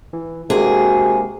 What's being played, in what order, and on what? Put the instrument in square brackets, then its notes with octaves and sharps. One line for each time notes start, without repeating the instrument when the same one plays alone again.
[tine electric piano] E3
[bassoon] C3 [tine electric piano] G#3 A#3 D4 [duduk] F#4 [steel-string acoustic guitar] G#4